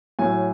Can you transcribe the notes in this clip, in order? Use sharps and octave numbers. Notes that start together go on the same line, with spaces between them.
A2 F#3 G#5